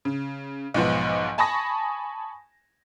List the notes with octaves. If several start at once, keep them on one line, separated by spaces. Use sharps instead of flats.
C#3
B1 G#2 F3 B3
G#5 A5 B5 C#6 D#6 A#6